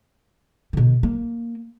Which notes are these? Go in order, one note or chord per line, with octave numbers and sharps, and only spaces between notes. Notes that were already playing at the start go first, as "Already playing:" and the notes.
B2 D3
A#3